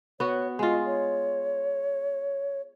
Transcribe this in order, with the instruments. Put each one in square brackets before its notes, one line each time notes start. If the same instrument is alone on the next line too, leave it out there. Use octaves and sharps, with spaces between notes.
[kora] B3 F#4 [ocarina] C#5
[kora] G#3 F4 [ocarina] D#5
[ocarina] C#5